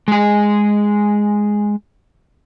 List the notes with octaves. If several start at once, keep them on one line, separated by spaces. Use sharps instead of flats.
G#3 G#4